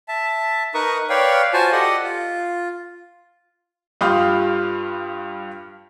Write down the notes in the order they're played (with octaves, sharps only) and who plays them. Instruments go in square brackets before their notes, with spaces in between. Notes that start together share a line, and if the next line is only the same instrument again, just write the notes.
[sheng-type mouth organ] E5 A5
D#4 A#4 B4 C#6 D#6
B4 C#5 D5 F5 G5
F4 F#4 C5 G#5 A5
G4 A4 D5 D#5 F#5 D#6
F4
[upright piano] G2 F4 G4 B5 D#6 F6